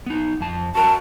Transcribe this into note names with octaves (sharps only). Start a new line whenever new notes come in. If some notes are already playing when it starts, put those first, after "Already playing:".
B3 D#4
F2 A5
F#4 A#4 F#5 A5